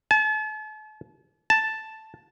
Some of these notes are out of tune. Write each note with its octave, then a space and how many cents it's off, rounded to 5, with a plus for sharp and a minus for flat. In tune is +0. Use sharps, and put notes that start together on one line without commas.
A5 -40
A5 +0